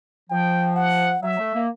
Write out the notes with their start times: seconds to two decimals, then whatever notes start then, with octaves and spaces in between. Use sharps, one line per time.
0.30 F3 G5
0.76 F#5
1.22 F#3 E5
1.38 A3
1.54 A#3